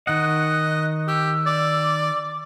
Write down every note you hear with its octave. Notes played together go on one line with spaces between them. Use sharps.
D#3 D#5 F#5 F#6
G4 E6
D5 D6